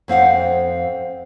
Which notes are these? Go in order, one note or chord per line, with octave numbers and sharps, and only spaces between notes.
F2 C4 F5 F#5